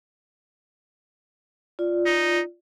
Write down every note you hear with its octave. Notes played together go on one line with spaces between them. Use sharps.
F4 D5
D#4